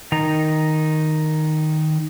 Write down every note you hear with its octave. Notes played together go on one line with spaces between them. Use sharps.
D#3 D#4 A#5